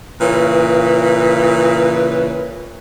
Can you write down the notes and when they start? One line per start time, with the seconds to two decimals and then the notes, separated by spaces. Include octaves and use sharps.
0.21 A#2 C#3 E3 B4